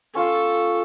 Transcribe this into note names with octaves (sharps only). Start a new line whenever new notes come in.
C#4 F4 A4